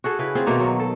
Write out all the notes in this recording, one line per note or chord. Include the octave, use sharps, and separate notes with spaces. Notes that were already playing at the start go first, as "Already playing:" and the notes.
F#4 G#4 A4
C#3 E4 B4
C4 F4 G#4
B2 D#3 A3 A#3
F#3
A4